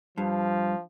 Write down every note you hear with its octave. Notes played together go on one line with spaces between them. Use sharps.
G2 F3